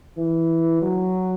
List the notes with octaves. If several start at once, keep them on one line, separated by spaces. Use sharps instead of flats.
E3
F#3